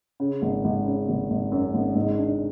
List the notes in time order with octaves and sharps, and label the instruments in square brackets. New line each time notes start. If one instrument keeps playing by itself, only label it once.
[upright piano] C#3
G#1
G#1
C#3
G#1
G#1
F#2
G#1
G#2
D4